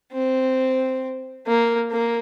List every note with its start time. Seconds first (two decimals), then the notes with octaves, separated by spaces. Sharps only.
0.13 C4
1.47 A#3
1.91 A#3